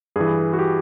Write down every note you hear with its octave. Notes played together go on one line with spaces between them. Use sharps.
G2 E3 G#4
F#4
G4